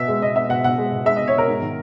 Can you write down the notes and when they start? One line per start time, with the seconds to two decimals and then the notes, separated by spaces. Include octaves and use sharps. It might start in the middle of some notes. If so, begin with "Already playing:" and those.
Already playing: B2 B3 E5
0.08 G#3
0.22 B2 D#5
0.36 B3 E5
0.49 B2 F#5
0.64 B2 F#5
0.78 G#3
0.92 B2
1.05 G#3 E5
1.16 D#5
1.20 B2
1.28 C#5
1.35 B2 A#4
1.48 G#2
1.62 D#3